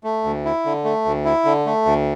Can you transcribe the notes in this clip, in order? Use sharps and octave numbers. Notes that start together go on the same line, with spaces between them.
A3
D2
E4
D3
A3
D2
E4
D3
A3
D2